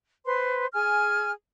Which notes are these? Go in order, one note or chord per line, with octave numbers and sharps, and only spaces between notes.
B4 C5 C6
G#4 G#5 F6